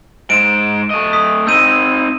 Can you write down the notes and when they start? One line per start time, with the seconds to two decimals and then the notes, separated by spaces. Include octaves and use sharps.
0.30 G#2 C5 D7 E7
0.90 A3 D#5
1.13 D#6 B6
1.47 C4 D#4 E6 G6 D#7